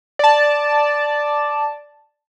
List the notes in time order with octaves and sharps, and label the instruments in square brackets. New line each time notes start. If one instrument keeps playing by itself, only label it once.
[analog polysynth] D5 A5